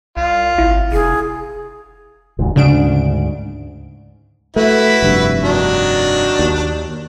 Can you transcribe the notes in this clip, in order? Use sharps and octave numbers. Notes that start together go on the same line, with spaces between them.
C2 F4
G#1 E4
F1 G#4
F1 D2 G#2
D2 G#2 C#3 D4 D7
A3 E4 F#4 B4
F1 G2
D#3 F#3 D4
D#2